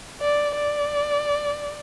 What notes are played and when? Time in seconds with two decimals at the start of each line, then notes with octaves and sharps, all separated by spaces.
0.21 D5
0.55 D5